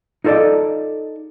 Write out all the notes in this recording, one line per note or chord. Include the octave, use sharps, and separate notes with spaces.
D#4 F4 A4 C5 D5 D#5